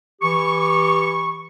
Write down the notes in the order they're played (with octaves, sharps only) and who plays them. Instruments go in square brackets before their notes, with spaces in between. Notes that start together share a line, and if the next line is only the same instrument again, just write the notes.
[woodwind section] E3 G4 C#6